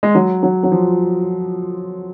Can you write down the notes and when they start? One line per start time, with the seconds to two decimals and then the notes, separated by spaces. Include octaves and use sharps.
0.03 G#3
0.15 F#3
0.43 F#3
0.63 F#3
0.71 F3